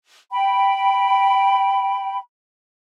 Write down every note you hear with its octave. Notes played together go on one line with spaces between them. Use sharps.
G5 B5